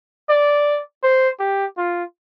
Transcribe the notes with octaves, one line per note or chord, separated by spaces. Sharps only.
D5
C5
G4
F4